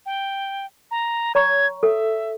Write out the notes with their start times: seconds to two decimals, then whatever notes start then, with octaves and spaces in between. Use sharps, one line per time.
0.06 G5
0.91 A#5
1.35 C#5 A#5 C#6 G#6
1.83 A4 E5